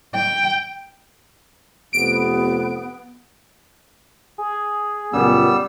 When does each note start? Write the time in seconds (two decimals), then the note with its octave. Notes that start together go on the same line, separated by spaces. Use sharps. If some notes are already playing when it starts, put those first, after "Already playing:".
0.15 G5
1.93 F1 B3 D7
4.38 G#4
5.13 C#2 F#2 A#2 G3 B3 E6